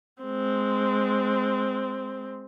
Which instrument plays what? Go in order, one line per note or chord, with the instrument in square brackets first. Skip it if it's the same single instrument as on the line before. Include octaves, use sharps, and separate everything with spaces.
[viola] G#3 C4